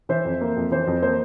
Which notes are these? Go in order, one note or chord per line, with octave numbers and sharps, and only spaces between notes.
E3 C5 E5
F2
A#3
F2
E3 C5
F2
A#3 C5